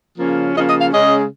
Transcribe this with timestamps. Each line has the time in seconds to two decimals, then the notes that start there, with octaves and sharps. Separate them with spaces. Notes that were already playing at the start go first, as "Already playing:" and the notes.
0.18 C#3 F3 A#3 C#4
0.54 C#3 F3 A#3 C#4 D#5
0.68 D#5
0.79 F5
0.91 C#3 G#3 C#4 D#5